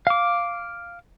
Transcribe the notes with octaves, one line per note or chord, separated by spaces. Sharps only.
F5 D6